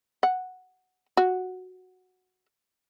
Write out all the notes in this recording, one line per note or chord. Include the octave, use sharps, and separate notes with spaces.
F#5
F#4